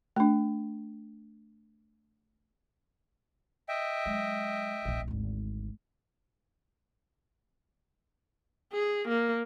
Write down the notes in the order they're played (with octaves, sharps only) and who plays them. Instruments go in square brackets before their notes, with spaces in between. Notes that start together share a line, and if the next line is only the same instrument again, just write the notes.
[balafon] A3 D4
[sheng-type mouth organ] D#5 E5 G5
[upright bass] F#3 G#3
D1 A#1
G#1 D2
[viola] G#4
A#3